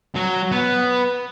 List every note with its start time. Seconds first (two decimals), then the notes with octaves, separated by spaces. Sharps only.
0.15 F#3
0.52 B3